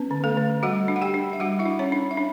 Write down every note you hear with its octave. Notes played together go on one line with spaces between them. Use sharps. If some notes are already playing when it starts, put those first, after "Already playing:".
Already playing: B3 C#4 B4
D3
A3 A4
D3
G3 F#4 F#5
D4
F#5
G4 G5
D4
E5
G3 F#4 F#5
E4 E5
D4
C#4 C#5
D4
E5
D4